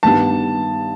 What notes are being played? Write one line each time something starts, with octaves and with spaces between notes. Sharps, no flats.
G2 D#3 G3 B3 A5